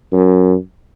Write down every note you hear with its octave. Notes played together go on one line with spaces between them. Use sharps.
F#2